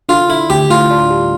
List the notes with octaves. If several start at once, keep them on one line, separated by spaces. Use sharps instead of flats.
D3 F4
D3 E4
D2 G4
A2 F4
D4
G3